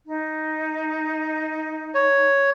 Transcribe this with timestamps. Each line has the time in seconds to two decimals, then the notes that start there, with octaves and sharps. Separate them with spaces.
0.07 D#4
1.95 C#5